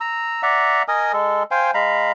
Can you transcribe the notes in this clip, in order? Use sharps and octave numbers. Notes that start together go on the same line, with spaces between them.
A#5 E6
D5 E5 F#5 A#5
A#4 D#5 G#5 D#6
G#3 A4
C5 F5 G5 G#5
G#3 F5 A#5 B5